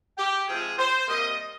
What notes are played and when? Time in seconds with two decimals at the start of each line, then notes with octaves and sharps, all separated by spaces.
0.18 G4
0.48 C3 F3 G#3 G#4
0.79 C5
1.08 C3 G3 A#3 D#5